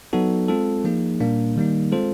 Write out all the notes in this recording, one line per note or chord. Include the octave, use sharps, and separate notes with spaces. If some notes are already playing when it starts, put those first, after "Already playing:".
F#3 B3 D#4 F#4 A4
G#3 C4 F4 A4
F3 A#3 D#4 G#4
A#2 G3 A#3 D4
D#3 G3 A#3 D#4
G#3 C4 F4 A4 C5